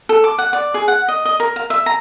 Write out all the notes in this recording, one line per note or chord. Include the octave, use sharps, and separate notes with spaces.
A4
D6
F#5
D5
G#4
F#5
D#5
D#5
A#4
F5
E5
A#5